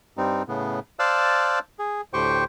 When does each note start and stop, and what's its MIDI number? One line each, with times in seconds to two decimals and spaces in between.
0.17 0.43 43
0.17 0.43 55
0.17 0.43 60
0.17 0.43 63
0.48 0.79 45
0.48 0.79 49
0.48 0.79 59
0.99 1.59 72
0.99 1.59 74
0.99 1.59 77
0.99 1.59 81
0.99 1.59 88
0.99 1.59 90
1.79 2.01 68
2.13 2.44 38
2.13 2.44 45
2.13 2.44 67
2.13 2.44 72
2.13 2.44 79
2.13 2.44 85